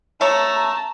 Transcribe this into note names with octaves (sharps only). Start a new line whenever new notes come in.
A3 C#5 A5 A#5